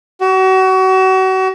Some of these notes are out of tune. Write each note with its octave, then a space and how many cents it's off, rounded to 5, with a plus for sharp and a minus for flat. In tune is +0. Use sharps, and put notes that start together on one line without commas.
F#4 +35